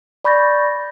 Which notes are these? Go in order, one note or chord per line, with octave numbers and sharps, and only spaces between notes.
D5 B5 C#6 G6 A6 A#6